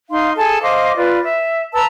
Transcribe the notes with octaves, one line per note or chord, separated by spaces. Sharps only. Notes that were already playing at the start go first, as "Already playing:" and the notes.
D#4 F5 C6
G#4 A4 G#5 A5
C5 D#5 F5 D6
F4 B4 D5
E5
B4 A5 A#5 E6